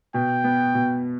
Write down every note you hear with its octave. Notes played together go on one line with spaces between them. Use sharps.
B2 G5
B3
B2